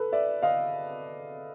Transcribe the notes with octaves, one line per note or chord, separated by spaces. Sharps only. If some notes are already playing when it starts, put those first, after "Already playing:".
Already playing: A4 B4
D5 E5
D#5 F5